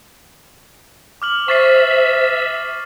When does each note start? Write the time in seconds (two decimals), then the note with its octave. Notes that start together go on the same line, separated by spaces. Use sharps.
1.22 D6 F6 F#7
1.48 C5 E5 C#6 A6 C7